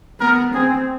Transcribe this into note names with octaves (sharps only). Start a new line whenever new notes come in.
B3 A#4
C4 G#4